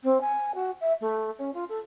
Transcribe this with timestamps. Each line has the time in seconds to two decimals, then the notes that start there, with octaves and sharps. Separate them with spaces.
0.03 C4
0.21 G#5
0.54 F#4
0.81 E5
1.01 A3
1.38 C#4
1.53 F4
1.69 A4